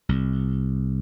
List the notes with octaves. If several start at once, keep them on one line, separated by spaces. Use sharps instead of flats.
C2